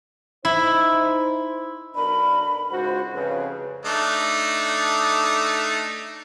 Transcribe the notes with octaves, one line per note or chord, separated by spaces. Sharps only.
D#4 E4 C5
B1 D4 A#4 B5
C#2 G#2 F#4 C5
F2 C#3 B4
A3 D4 D#4